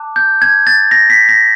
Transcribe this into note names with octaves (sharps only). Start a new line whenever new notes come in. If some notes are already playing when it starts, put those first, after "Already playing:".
Already playing: A5 D6 F#6
G6
G#6
A6
A#6
B6
A#6